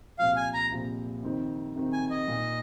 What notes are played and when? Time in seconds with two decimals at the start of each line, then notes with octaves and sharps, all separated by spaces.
0.19 C2 A#2 F3 C4 F5
0.36 G#5
0.54 A#5
0.71 C2 A#2 F3 C4
1.23 F2 C3 D#3 C4 D#4
1.75 F2 C3 D#3 C4 D#4
1.93 G#5
2.10 D#5
2.28 A#2 A#3 D#4